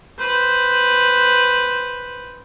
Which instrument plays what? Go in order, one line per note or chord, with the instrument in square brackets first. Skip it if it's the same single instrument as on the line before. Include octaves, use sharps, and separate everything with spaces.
[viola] B4 C5